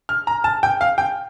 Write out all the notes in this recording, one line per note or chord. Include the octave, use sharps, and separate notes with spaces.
F6
A#5
A5
G5
F5
G5